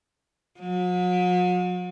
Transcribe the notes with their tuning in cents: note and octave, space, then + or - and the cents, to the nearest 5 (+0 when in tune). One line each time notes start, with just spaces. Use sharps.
F#3 -45